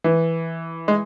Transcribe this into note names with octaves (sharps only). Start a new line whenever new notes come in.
E3
G#3